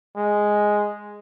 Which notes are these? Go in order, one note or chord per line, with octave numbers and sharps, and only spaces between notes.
G#3